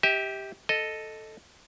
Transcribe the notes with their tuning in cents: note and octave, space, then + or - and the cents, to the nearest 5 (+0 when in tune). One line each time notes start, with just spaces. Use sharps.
G4 +0 E5 -40
A4 +0 D#5 -5